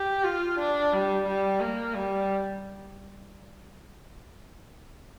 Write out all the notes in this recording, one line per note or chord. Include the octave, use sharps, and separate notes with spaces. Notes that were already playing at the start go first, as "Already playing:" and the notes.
Already playing: G4
F4
D4
G3
G3
A#3
G3